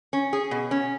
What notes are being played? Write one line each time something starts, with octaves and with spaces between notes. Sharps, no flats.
C#4
G#4
B2
C#4